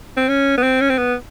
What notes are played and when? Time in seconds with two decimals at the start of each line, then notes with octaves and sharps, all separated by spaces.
0.17 C4
0.29 C#4
0.58 B3
0.63 C4
0.81 C#4
0.90 C4
0.98 B3